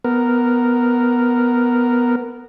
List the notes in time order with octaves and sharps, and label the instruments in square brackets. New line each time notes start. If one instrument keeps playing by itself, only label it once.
[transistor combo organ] B3 A#4